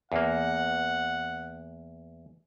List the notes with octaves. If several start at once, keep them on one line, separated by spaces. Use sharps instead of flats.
E2 A#3 F#5